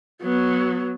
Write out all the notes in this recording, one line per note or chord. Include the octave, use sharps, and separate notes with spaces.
F#3 B3